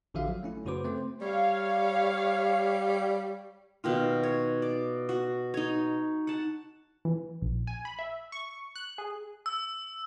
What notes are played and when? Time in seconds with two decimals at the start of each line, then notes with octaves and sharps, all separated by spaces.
0.14 A1 D3 F3 F#4 E5 F5
0.28 F#3
0.43 A3 C#4 E4
0.65 F#2 C#3 F#4 B4 C5 D6
0.84 A3 C4 C5
1.21 G3 C#5 F5
3.84 B2 D#3 F4
4.23 C#5
4.62 D5
5.09 F#4
5.54 D#4 C#5
6.27 F#5 A5
7.05 E3
7.42 A#1
7.67 G#5
7.85 B5
7.99 E5
8.32 C#6
8.76 F#6
8.98 G#4
9.46 E6